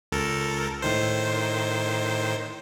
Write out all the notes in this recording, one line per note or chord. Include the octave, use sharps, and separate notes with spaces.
C#2 A4 A#4
A2 D#3 C5